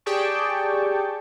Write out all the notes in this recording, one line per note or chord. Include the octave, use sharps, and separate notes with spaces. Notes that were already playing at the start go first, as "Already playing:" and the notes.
G4 G#4 D5 G5 A5 C#6